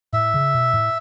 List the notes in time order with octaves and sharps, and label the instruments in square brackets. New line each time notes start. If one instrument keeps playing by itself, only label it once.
[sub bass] A2 [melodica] E5
[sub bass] C#3
B2
A2